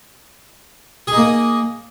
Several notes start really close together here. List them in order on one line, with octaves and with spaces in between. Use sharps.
G#4 D#4 A#3